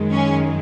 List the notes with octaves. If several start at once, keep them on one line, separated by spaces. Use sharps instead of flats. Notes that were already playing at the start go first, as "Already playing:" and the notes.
Already playing: F#2 D#3 G#3
C#4